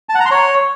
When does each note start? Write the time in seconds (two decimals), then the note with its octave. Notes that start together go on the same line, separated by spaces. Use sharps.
0.09 A5
0.15 F#5
0.20 A#5
0.26 C6
0.31 C#5